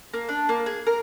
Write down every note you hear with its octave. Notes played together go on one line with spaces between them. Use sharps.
A#3
D4
A#3
G#4
A#4